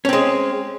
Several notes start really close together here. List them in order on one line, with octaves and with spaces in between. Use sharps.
C#4 C4 G#3